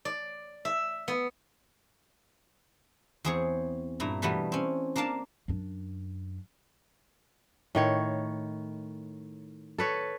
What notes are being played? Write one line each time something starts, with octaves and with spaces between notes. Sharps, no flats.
D5
E5
B3
E2 C4 G#4 C5 C#5
G2 A#2 E4 A#5
B2 E3 G3 A3 B3
C4 C#4
A#3 D4 A#4 F5 A5
F#2 D4
A2 D#3 C#5
A4 B4 C#5